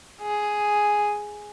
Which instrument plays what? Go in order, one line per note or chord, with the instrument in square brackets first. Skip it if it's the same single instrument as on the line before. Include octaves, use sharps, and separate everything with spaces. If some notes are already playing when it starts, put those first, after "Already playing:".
[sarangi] G#4